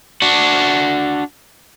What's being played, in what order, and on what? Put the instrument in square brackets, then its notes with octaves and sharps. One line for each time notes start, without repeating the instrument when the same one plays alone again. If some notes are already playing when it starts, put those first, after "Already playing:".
[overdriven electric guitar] D4 F#4